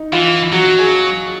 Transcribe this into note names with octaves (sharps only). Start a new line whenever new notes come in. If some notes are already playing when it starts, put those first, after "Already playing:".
Already playing: D#4
E3 F4
F#3 F#4
G#4